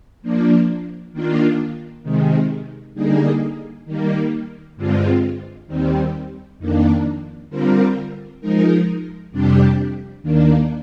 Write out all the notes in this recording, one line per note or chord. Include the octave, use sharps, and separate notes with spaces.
F3 A#3 D4
D#3 A#3 D4 F4
C3 D#3 G#3
D3 G3 A#3 D#4 G#4
D#3 G3 A#3
G2 D3 G#3 C4 F4
D#2 D#3 G3 C4
F2 D#3 A#3 D4
D3 G3 C4 F4 A#4
F3 G#3 D#4 A#4
F2 C3 G3 D4 G4
D#2 D#3 A#3 D4